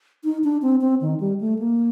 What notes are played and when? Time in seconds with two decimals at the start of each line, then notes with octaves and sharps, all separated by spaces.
0.24 D#4
0.44 D4
0.62 C4
0.81 C4
1.01 D#3
1.20 G3
1.41 A3
1.59 A#3